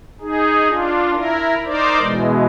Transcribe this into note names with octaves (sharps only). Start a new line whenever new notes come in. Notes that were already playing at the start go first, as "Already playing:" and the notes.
D#4 G#4
D4 F4
E4 A#4
D#4 A#4 C5 D5
B2 E3 G#3